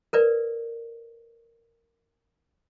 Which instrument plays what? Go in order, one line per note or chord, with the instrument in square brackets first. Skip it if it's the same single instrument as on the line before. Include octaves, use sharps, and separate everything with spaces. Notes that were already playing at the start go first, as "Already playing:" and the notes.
[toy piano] A#4 B4 D5